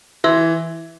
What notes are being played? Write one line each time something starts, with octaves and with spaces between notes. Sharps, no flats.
E3 E5 C6 E6